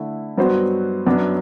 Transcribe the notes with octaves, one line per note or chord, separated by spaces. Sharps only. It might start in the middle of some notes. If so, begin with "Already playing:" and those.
Already playing: D3 A3 E4
G2 F#3 B3 F#4 C5
F#2 F#3 B3 D4